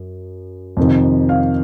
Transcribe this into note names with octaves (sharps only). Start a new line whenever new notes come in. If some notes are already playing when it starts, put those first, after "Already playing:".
Already playing: F#2
F2 C3 D#3
F5